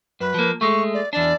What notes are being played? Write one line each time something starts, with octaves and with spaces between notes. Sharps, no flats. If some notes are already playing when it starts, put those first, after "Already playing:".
F#2 B4
F3 A#3
G#3 A3 C#6
D5
E2 D4 D5